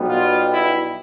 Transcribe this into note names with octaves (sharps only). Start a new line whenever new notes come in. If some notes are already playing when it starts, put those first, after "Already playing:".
Already playing: B1 B2 G3 B3
F4
E4